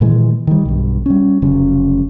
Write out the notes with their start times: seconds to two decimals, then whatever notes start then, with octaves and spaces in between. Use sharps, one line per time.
0.01 A#2 D#3 E3 G#3
0.47 D#3 G3
0.65 B1 G2
1.06 G3 C#4
1.42 F1 C#3 F#3 C#4